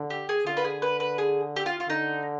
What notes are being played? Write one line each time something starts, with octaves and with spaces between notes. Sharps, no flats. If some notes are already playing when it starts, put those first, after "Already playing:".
Already playing: D3
G4
G#4
D3 F4
B4
G#4
B4
B4
G#4
G4
F4
F4
D3 D#4